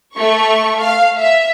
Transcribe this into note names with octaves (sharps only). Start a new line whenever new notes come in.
A3 C#6
F5
E5